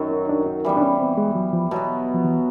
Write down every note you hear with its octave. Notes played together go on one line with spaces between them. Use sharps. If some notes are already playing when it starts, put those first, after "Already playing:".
Already playing: F#2 D#3 F#3
D#4
D4
D#4
E3 G3 B3
D4
C#4
C4
G#3
F#3
F3
B2 F#3 B3
F3
E3